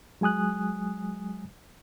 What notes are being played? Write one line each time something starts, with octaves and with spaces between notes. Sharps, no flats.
F#3 G#3 G#5 D#6 F#6